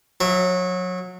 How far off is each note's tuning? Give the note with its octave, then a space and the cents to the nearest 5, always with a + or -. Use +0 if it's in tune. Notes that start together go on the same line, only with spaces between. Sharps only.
F#3 -25 E5 +0